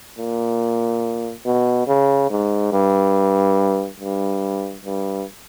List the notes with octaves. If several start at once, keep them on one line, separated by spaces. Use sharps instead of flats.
A#2
B2
C#3
G#2
G2
G2
G2